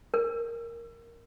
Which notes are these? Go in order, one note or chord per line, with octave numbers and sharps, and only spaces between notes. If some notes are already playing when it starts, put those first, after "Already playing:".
A#4